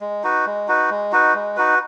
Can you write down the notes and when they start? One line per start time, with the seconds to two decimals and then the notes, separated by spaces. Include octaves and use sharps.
0.01 G#3
0.23 D#4 F#4 B4
0.46 G#3
0.68 D#4 F#4 B4
0.90 G#3
1.12 D#4 F#4 B4
1.35 G#3
1.56 D#4 F#4 B4